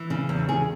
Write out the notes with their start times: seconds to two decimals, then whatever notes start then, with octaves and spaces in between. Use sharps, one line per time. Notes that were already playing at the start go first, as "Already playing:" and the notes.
Already playing: E3
0.10 C#3
0.29 E2
0.49 E2 G#4